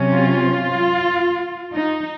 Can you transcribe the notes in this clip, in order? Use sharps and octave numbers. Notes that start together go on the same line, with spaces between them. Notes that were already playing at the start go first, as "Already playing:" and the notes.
Already playing: C3 F#3 C#4
F4
D#4